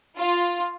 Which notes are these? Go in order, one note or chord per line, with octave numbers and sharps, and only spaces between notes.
F4